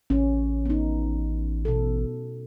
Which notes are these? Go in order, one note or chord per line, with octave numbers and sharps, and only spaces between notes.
A1 C#4
B3 D#4
B2 A4